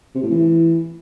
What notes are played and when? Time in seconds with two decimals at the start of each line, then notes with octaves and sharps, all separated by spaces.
0.15 C3
0.23 A2
0.30 E3